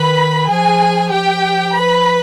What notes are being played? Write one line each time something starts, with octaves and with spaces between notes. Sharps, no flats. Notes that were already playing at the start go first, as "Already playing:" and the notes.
Already playing: D#3 B4 B5
F3 G#4 G#5
F3 G4 G5
B4 B5